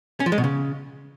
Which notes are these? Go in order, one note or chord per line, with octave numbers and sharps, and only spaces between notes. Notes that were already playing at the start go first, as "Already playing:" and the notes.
C#4
F3
G#3
B2
C#3